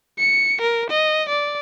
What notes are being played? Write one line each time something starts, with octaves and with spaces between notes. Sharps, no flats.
C#7
A#4
D#5
D5